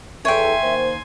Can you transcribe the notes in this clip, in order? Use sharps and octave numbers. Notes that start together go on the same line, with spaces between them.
E2 A4 C#5 E5 G5 G#5 C6
D#3 A#3 C5